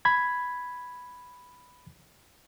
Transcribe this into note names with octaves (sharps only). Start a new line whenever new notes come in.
B5 G#6